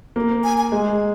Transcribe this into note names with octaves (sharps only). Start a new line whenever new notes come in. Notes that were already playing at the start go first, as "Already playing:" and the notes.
A#3
G#5
G#5
G#3